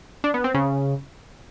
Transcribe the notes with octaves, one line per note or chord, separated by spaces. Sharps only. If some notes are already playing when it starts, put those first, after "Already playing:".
D4
B3
C4
C#3